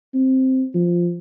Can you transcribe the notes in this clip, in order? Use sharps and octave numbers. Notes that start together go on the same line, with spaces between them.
C4
F3